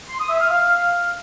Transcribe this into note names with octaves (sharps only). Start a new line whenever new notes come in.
C6
D#6
E5
F6
F5